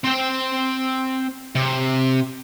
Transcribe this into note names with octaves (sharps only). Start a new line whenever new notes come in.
C4 G5
C3